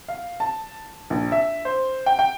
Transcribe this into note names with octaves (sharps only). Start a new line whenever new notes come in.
F5
A5
A#1
E5
C5
G5
G5